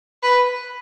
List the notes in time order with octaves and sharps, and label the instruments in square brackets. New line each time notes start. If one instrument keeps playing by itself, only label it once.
[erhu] B4